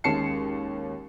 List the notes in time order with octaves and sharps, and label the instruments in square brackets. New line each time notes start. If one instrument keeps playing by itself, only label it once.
[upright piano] D#2 G#3 C#4 A5 C7 C#7